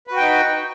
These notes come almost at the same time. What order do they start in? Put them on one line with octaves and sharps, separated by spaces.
B4 F#4 G5 D#4